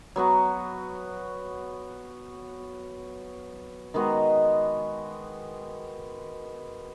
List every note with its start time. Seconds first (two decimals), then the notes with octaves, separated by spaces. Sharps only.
0.16 F#3 B3 F#4
3.94 D#3 G#3 B3 F#4